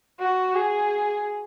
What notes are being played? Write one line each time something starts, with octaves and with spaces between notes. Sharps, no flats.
F#4
G#4